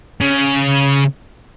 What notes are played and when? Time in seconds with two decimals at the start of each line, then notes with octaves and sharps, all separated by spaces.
0.20 C#3